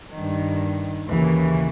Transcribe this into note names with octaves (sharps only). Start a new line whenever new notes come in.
G2 D#3
D#2 C#3 E3